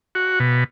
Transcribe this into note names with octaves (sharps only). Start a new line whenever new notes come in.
F#4
B2